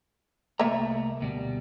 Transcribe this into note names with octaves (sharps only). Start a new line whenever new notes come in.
C2 A3 A#3 E5 A#5
D2 B2 G3